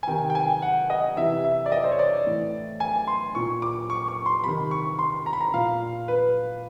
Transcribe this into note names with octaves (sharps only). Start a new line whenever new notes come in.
G#5
C3 D#3 G5
G5
G#5
F#5
D#5
C3 E3 E5
E5
D5
D#5
C5
C#5
D5
A2 E3
G#5
C6
A#2 C#6
D6
C#6
C#6
C6
C3 D#3 B5
C#6
C6
A#5
B5
A#5
A#2 F5
B4